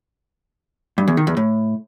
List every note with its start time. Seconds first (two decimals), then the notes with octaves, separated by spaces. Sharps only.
0.98 G2
1.08 E2
1.17 D#3
1.27 E2
1.37 A2